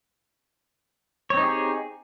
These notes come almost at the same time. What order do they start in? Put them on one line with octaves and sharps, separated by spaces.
C#5 C4 D#4 G4 G#4